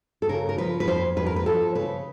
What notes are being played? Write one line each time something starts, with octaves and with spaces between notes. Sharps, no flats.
A4
C#3 A#4
A#4
F3 B4
B4
F2 C5
F2 B4
A#4
B4
F3 A4
C#3 B4